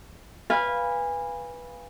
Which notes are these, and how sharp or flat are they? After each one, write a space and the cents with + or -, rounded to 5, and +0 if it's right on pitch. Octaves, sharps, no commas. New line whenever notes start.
B4 -10 F5 +0 G#5 -25